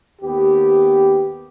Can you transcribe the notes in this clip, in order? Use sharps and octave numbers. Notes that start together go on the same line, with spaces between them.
D#2 B3 G4